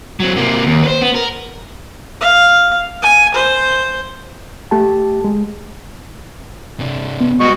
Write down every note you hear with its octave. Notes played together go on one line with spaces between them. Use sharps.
F#3 C4
C3 A#3
D#2
B4 C5
B3
A#4
F5
G#5
C5
A3 G4 A5
G#3
C3 D4
B3
G3 G#3 F#4 D#5 C#6